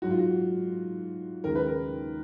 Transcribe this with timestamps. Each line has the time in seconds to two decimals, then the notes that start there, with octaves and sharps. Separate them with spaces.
0.02 G#2 F#3 F#4
0.10 F4
0.19 F#4
1.44 D#2 C#3 G#3 A#4
1.55 B4
1.67 A#4